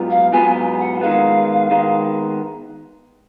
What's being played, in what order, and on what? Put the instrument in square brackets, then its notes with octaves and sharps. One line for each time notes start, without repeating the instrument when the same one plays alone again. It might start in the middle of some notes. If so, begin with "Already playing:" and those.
Already playing: [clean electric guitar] G#2 F#3 B3 F4
[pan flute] F5
[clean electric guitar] G#2 F#3 B3 F4 [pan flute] G#5
[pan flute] F#5
[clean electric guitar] D#3 G#3 B3 [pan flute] F5
[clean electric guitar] D#3 G#3 B3